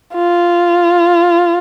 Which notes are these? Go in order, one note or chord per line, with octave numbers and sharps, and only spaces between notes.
F4